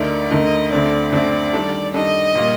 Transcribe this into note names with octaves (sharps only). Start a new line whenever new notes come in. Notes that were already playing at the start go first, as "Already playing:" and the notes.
Already playing: D2 D3 A3 D#4 A#4 D5
D2 D3 A3 D#4 A#4 D#5
D2 D3 A3 C4 D5
D2 D3 A3 C4 D5
D#3 G3 D4 A4
D#3 G3 D4 A4 D#5
A#2 G3 A#3